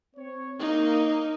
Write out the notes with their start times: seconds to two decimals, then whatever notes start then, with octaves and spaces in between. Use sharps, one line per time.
0.16 C4 C#5
0.59 A#3 D#4